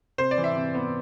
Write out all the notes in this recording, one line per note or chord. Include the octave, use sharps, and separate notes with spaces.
C3 C5
D5
E3
E5
C3
B3